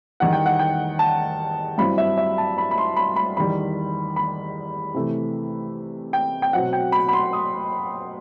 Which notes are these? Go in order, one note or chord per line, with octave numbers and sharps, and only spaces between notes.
E2 D#3 G3 D#4 F#5
G5
F#5
G5
A5
G2 F#3 C4 E4 B5
E5
E5
A5
B5
B5
C6
B5
B5
E2 D#3 G3 B5
B5
C3 E3 A3
G5
G5
B2 F#3 C4 F#5
G5
B5
B5
C6
D#6